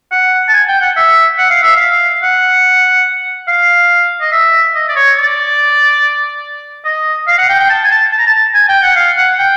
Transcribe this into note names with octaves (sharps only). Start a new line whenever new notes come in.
F#5
A5
G#5
G5
F#5
E5
F#5
F5
E5
F5
F#5
F5
D#5
E5
D#5
D5
C#5
D5
D#5
F5
F#5
G5
G5
A5
G#5
A5
A5
A#5
A5
G#5
G5
F#5
F5
F#5
G5